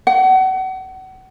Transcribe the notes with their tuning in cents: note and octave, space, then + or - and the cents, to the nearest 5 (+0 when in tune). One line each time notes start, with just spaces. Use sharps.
F#5 +30